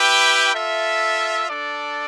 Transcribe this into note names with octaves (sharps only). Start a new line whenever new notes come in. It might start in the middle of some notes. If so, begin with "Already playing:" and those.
Already playing: E4 G4 B4 E5 G5
F4 A4 E5
D4 A4 D5